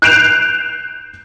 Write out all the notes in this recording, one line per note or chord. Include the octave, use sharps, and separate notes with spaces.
F#6 G6 C7 D7 E7 F7